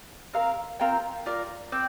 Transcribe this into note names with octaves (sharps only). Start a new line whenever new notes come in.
C4 A#4 F5
C4 F4 A#4 G5
F4 A#4 D5
C4 D5 G5